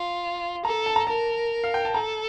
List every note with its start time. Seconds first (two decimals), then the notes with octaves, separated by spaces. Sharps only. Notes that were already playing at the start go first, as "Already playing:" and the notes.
Already playing: F4
0.65 A4 A#5
0.86 A5
0.96 A#5
1.07 A#4 A5
1.64 F5
1.74 G5
1.85 A5
1.94 A4 A#5